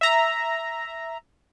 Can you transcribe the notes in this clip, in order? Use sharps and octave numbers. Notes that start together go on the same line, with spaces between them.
E5 A#5